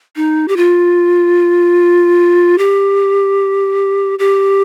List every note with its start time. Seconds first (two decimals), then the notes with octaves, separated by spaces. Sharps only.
0.16 D#4
0.48 G4
0.57 F4
2.58 G4
4.19 G4